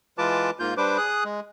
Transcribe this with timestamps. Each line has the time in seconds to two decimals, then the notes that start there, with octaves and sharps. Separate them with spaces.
0.18 E3 G#3 F4 B4 A5 D6
0.60 G#2 A#3 F4 G6
0.77 G3 D4 B4 C5 D6
0.98 G#4 D#6 F#6
1.24 G#3